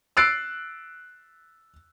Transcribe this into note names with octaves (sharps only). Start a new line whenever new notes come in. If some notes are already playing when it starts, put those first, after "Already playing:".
E6 F#6 A6 C7 D7